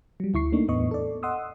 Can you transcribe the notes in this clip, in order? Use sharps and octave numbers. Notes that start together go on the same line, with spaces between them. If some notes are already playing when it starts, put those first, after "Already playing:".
F#3 G3
D2 E4 C#6 C7
A3 A#3 D4 D#4
E2 A2 B3 D#5 C#6
A4 D5
D#5 F#5 C6 D#6 E6